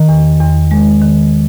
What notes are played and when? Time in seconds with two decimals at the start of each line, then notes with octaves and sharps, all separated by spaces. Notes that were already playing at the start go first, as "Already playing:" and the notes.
Already playing: D#3
0.09 E2
0.40 E2
0.71 G#3
1.02 D#3